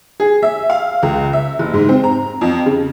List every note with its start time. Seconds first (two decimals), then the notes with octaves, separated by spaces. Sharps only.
0.20 G#4
0.43 E5
0.70 F5
1.03 C#2
1.33 E5
1.59 F#1
1.74 G#2
1.89 C4
2.04 A#5
2.41 F2
2.66 C#3